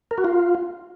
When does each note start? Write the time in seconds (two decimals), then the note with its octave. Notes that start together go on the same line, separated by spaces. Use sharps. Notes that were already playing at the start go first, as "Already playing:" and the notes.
0.11 A#4
0.18 F#4
0.24 F4